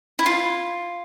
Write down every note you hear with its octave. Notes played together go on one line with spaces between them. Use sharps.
E4
F4